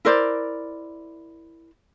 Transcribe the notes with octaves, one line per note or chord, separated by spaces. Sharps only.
E4 A#4 C5 D5